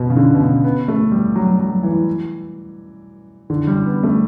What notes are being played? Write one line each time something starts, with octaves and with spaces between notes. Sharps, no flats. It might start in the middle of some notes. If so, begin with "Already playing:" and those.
Already playing: B2
C#3
D3
B2
C#3
B3
A3
G3
F#3
F#3
E3
D3
G3
B3
A3